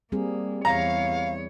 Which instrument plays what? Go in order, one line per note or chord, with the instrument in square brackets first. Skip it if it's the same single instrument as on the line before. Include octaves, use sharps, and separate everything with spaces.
[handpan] G3 C4 G#4 [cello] A#3
[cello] E2 C#5 [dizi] F5 [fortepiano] A#5